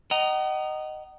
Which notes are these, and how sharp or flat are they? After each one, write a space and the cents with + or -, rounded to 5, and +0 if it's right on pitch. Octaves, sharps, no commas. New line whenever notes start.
D#5 -10 F#5 +40 A#5 +0